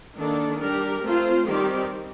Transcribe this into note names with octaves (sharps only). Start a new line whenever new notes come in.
D#3 A#3 D4 A4
G3 D4 G4 A#4
A3 C4 F4 C5
D#3 G3 C4 G4